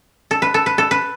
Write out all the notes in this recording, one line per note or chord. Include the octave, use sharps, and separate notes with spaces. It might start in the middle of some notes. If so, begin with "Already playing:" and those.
A4
B4
A4
B4
A4
B4